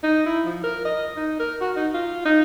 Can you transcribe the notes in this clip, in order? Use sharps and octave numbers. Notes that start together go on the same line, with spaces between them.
D#4
E4
F3
A#4
D#5
D#4
A#4
F#4
D#4
F4
D#4